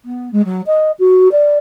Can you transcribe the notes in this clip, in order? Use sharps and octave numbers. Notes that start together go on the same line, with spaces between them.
B3
G#3
F#3
D#5
F#4
D5